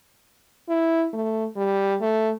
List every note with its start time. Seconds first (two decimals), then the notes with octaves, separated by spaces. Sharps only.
0.69 E4
1.13 A3
1.56 G3
2.01 A3